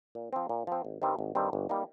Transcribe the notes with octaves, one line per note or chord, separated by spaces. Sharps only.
A#2
F3 C4
A#2
F3 C4
G#1
G2 D#3 G3 C4
G#1
G2 D#3 G3 C4
G1
G3 A#3 D#4